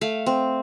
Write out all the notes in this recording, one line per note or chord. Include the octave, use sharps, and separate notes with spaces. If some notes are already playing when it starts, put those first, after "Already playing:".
A3 F5
C4